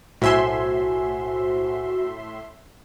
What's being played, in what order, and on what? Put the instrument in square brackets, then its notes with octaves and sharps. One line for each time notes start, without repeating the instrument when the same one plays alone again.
[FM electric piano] B1 C5 G#5 [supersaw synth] A2 E5 C6 [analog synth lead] F#4